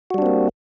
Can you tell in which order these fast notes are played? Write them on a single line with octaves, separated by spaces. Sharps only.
F#4 G3 D4 C4 A#3